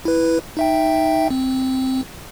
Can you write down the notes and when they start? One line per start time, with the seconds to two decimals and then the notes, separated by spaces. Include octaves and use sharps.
0.05 E4 B4
0.57 D#4 E5 G5
1.30 C4